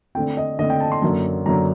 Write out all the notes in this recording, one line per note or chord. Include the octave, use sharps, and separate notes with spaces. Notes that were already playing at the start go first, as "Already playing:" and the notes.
D3 A3 C4 G5
D#5
D3 A3 C4 D#5
G5
A5
C6
F#2 D3 F#3 A#3
F#2 D3 F#3 A#3 A#5